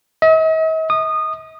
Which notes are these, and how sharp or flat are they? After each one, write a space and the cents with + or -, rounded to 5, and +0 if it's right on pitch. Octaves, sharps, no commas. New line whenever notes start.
D#5 +45
D#6 -20